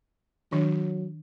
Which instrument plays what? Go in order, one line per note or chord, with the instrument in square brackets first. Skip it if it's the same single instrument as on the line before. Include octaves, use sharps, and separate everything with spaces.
[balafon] D#3 D4 [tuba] F#3